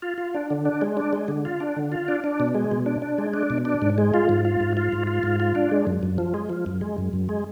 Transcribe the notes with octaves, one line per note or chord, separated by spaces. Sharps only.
F4
F4
D4
D3
D4
G#3
D4
G#3
D3
F4
D4
D3
F4
D4
D4
B2
G#3
B2
D4
D4
G#3
D4
B2
D4
G#2
G#3
F4
G#2
F4
G#2
F4
G#2
F4
G#2
F4
D4
G#3
F#2
F#2
F3
G#3
F3
F#2
G#3
F#2
F#2
G#3